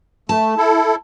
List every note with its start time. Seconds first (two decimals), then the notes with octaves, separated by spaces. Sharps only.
0.29 A3 A5
0.57 E4 A4